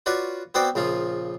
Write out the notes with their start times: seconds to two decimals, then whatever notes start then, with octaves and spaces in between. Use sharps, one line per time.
0.06 F4 F#4 B4 C#5 D5
0.55 B3 C4 F#4 C5 D5 G5
0.75 A#1 C#3 F3 F4